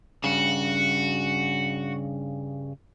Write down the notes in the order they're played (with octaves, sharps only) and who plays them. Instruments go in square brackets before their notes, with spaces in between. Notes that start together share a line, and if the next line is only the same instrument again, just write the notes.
[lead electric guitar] G2 C#3 [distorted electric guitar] F#4